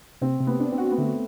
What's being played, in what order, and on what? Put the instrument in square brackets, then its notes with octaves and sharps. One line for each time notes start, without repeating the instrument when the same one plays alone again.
[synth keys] C3 [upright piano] C4
[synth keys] C3
[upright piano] B3
[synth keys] D4
[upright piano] C4
[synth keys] F#4
[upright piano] B3
[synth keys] D3 [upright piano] A3